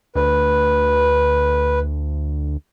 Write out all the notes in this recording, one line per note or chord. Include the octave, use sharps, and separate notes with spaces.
D2 B4